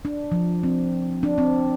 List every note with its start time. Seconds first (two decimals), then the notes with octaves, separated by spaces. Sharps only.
0.05 D4
0.32 F3
0.63 C4
1.23 D4
1.38 C4